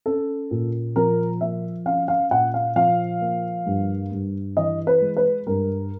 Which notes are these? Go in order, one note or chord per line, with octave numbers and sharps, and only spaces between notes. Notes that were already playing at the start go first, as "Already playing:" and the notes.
C#4 A4
A#2
F3 A#4
A#3 E5
C#4 F5
F5
A#2 F#5
F5
F3 F5
A#3
G2
G2
E3 D#5
B4
G#3
B4
G2 A#4